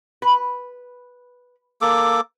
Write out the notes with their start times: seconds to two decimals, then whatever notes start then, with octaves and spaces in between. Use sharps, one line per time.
0.22 B4
1.82 A#3 A4 D6